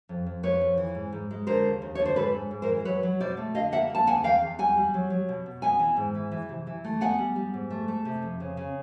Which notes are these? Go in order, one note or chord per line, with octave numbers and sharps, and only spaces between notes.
F2
F2
F2 B4 C#5
F2
E3
G#2
G#2
G#3
D3 A#4 C5
D#2
D#2
D3 C#5
C5
G#2 A4 B4
G#2
G#2
A#4 C5
E3
F#3 B4 C#5
F#3
B2 C5 D5
A3
D3 D#5 F5
A#3 E5 F#5
A#3
A5
D2 F#5 G#5
E2 F5 G5
E2
G3 F#5 G#5
G3
F#3
F#3
B2
B2
B3 F#5 G#5
E3
G#2
E3
E3
C3
E3
A3
B3 F#5 G#5
G3
G3
G#2
A3
A3
C3
F2
C#3
C#3